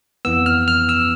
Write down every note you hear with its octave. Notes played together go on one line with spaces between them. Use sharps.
F2 E3 B3 E6
F6
F6
E6